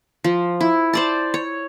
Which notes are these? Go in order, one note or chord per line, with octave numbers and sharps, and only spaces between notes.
F3
E4
C5 D5 A5
C#5